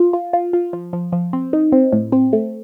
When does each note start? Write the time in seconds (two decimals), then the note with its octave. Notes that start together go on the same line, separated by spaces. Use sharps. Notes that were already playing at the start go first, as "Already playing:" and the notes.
Already playing: F4
0.13 F4
0.33 F4
0.53 F4
0.73 F3
0.93 F3
1.12 F3
1.33 C4
1.53 D#4
1.72 C4
1.92 A2
2.12 C4
2.33 A3